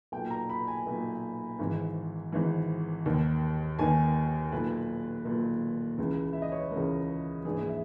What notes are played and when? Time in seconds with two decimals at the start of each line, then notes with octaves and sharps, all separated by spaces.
0.12 B1 A#2 G5
0.31 A#5
0.49 B5
0.68 G#5
0.86 B1 A#2
1.59 G#1 G#2 E3
2.32 G#1 G#2 E3
3.06 D#2 D#3
3.79 D#2 D#3 G#5
4.52 B1 A#2 B4
5.25 B1 A#2
5.98 C#2 C#3 E3
6.33 E5
6.42 D#5
6.52 C#5
6.62 B4
6.71 C#2 C#3 E3 A#4
7.45 A#1 G#2 E3 G#4
7.69 E5